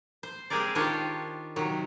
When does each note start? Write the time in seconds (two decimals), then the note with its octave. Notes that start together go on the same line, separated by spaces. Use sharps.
0.23 C5
0.50 G#3 C4 G4 G#4 A#4 D5
0.75 D#3 D4 F4 G4 C5 C#5
1.56 C3 D#3 F#3